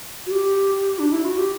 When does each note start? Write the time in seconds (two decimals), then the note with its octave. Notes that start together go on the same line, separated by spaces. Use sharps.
0.26 F#4
0.31 G4
0.99 D4
1.12 E4
1.25 F#4
1.38 G4